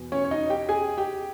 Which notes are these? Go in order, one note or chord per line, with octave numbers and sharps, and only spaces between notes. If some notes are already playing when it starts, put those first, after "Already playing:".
Already playing: E2 B2
C#4 C#5
C#5
D#4 D#5
G4 G5
G#4 G#5
G4 G5